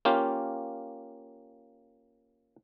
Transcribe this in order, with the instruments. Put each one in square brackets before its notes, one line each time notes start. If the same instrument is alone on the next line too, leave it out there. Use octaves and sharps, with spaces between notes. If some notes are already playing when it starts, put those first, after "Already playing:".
[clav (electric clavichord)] A#3 C#4 F4 G4